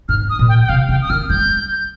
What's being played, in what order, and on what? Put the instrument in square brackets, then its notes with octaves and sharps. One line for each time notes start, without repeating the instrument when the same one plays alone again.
[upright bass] G#2 [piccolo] F6
[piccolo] D#6
[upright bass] A#2
[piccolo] G5
G5
[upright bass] C3 [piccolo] F5
[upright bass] C#3 [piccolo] G5
[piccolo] D#6
[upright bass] D#3 [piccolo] F6
[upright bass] G#3 [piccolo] G6